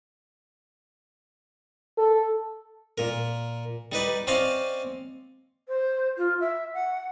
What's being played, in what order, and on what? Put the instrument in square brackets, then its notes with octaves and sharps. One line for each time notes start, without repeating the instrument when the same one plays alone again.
[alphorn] A4
[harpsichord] A#2 A#4
G3 D#4 B4 D5
C4 C#4 C5 D5 D#5 F5
[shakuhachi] C5
F4
E5
F#5